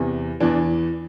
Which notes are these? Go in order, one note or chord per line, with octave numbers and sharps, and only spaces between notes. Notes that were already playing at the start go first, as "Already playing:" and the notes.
Already playing: E2 C3 E3
E2 E3 D4